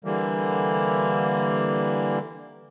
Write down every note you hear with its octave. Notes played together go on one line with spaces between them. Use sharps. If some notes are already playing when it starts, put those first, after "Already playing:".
D3 E3 G3 A#3